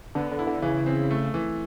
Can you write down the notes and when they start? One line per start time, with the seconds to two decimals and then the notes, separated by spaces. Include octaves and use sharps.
0.15 D3 B3
0.31 D3
0.39 E4
0.47 D3
0.62 C#3 E3
0.86 C4
1.11 A3
1.34 E3